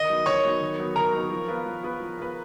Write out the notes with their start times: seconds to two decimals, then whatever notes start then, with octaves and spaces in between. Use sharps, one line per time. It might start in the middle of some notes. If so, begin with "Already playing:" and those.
Already playing: D#3 D#5 D#6
0.09 F#3 B3 D#4
0.26 D#3 C#5 C#6
0.44 F#3 B3 D#4
0.61 D#3
0.79 F#3 B3 D#4
0.96 D#3 A#4 A#5
1.13 F#3 B3 D#4
1.30 F3
1.48 B3 F4 B4
1.66 F3
1.83 B3 F4 B4
2.00 F3
2.18 B3 F4 B4